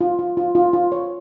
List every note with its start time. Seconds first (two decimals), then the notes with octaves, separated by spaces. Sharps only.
0.01 F4
0.19 F4
0.37 F4
0.55 F4
0.73 F4
0.92 C#5